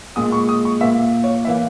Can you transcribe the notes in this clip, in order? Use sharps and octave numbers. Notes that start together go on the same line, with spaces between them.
A#2 G#3 D#6
C#6
D#6
C#6
A#2 A#3 E5
C#5
E3 A#3 E5